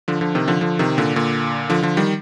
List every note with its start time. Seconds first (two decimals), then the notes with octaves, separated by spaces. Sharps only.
0.08 D3 F3
0.21 D3 F3
0.35 C3 D#3
0.48 D3 F3
0.61 D3 F3
0.79 C3 D#3
0.98 A#2 D3
1.16 A#2 D3
1.69 D3 F3
1.82 D3 F3
1.97 D#3 G3